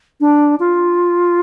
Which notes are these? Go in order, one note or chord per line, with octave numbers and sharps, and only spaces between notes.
D4
F4